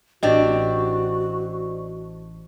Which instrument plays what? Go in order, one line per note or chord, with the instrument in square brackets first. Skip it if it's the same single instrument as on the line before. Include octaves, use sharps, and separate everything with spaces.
[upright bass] A1 [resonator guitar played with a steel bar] C4 D4 G4 [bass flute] F#4 [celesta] D#5